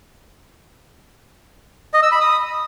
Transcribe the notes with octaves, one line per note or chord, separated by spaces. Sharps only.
D#5
E6
B5
D#6